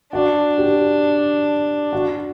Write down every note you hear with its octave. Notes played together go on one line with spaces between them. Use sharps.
D4 F#4
G4
F#4